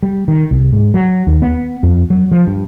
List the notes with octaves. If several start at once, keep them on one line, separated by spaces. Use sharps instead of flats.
G3
D#3
C2
G#2
F#3
D#2
B3
F2
F#3
F3
G2